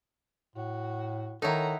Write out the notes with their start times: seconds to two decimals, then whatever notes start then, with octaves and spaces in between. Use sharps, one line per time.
0.56 A2 F#4
1.42 D#3 D#4 E4 A4 C#5 F#5 A#5